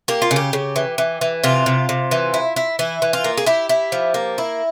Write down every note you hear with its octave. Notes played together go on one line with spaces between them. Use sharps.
A#3 G4
F4
C#3
G4
C#3
E3
E3
E3
C3 F4
C3
C3
E3
E4
E4
E3 E4
E3
F4
A#3
G#4
E4 G4
E4
F3
A#3
E4